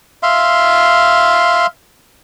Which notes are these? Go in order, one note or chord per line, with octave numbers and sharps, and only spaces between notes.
E5 F5 C6